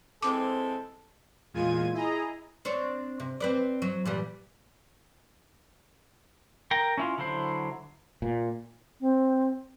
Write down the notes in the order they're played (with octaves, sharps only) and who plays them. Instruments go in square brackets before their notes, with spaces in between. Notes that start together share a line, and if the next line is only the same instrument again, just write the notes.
[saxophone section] E3 G#3 C4 [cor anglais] A4 [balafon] D6
[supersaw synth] E2 A#2 G#3 F4 G#6 D#7
E4 G#4 D#5 A#5
[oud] C4 D4 C#5
C3
C4 B4 D5
F#3
A#2 E3 G3
[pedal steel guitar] A#4 G5 A#5
C#4 E4 F4
D3 F#3 E4 C5
[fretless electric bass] A#2
[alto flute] C4